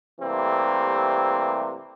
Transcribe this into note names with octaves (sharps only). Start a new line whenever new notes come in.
C3 E3 G3 A3 A#3 C4